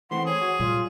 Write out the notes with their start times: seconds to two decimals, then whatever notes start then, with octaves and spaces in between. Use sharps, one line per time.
0.11 E3 A3 C4 F#5 C6
0.26 G#4 C#5
0.41 F#4
0.59 A#2 F#3 G3 F4